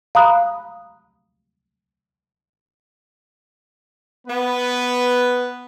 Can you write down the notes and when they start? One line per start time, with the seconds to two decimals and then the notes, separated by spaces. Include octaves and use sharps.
0.15 F5 A#5 B5 D#6 F#6
4.28 B3 B4